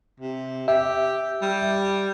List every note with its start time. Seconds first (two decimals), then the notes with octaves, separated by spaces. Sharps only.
0.20 C3
0.68 G4 E5
1.42 G3